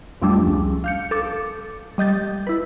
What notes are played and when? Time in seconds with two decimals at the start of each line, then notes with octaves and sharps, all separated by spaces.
0.21 F2 F3 G3 A3 D4
0.47 C#2
0.84 F5 G6 C#7
1.11 A4 D6
1.98 G3 D#5 G6 A6
2.47 E4 B4